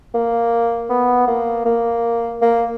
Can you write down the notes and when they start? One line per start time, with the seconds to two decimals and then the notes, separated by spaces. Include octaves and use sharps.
0.14 A#3
0.89 B3
1.28 A#3
1.66 A#3
2.42 A#3